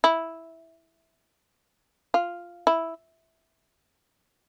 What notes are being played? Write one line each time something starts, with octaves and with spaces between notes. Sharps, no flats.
E4
F4
E4